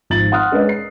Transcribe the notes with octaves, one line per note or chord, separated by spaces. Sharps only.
G#1 F3 A6 F#7
F#5 C6 D#6 F6 F#6
G#3 C#4 D4 A#4 B4 D#5
C7